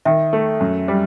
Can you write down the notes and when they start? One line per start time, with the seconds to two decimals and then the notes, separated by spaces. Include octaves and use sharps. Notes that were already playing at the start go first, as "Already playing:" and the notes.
0.05 D#3 E5
0.33 A3
0.60 F#2
0.88 G3